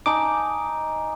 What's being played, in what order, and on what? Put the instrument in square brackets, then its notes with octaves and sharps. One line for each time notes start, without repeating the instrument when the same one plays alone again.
[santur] D#4 G#5 A5 [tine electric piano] D6